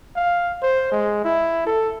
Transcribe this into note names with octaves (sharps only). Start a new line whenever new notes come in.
F5
C5
G#3
E4
A4